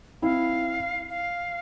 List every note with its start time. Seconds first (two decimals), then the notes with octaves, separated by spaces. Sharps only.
0.22 C4 E4 F5
1.09 F5